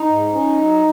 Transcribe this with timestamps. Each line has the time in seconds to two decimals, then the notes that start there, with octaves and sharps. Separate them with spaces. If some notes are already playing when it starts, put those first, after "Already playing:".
Already playing: D#4
0.09 G#2
0.33 C#4
0.58 F#3